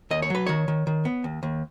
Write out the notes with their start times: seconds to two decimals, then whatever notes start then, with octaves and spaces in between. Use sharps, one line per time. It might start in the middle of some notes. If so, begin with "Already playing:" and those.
0.10 D#2 D#5
0.22 C#5
0.30 F#3 B4
0.47 D#3 C#5
0.68 D#3
0.87 D#3
1.05 B3
1.24 D#2
1.43 D#2